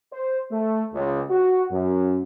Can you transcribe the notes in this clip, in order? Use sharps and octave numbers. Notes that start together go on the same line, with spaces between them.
C5
A3
C#2
F#4
F#2